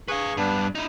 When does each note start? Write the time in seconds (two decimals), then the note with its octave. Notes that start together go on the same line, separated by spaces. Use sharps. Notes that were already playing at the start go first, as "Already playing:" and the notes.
0.08 G#4 B4 F5 C#6
0.37 G2 B3 D4
0.75 D#4 E4